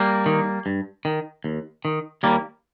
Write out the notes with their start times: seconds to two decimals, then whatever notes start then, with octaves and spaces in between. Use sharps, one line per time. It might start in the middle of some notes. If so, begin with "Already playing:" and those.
Already playing: G3 A#3
0.26 D#3
0.66 G2
1.05 D#3
1.44 D#2
1.85 D#3
2.23 D#2 G3 A#3